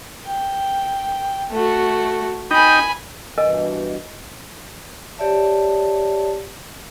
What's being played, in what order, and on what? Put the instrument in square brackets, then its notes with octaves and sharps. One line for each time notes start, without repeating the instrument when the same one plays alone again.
[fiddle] G5
A3 F#4
[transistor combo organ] D#4 G5 [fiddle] G#5 B5
[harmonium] G2 B2 E3 [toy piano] A#4 D#5 G#5
[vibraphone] G4 C#5 D5 E5 A5